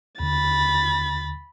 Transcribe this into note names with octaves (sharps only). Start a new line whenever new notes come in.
D#2 D3 B5 A6